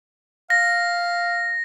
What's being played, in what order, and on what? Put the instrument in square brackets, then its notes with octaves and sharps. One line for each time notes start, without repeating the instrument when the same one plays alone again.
[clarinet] F5 [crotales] A#6